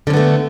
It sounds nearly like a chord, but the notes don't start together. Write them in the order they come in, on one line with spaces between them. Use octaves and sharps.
D3 C#4 B3 A3